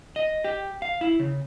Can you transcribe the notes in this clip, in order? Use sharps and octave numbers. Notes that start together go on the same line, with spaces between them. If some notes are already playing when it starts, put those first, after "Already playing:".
D#5
G4
F5
E4
C#3